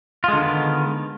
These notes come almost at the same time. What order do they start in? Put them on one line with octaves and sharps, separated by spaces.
F4 G#3 D3 D#3 B3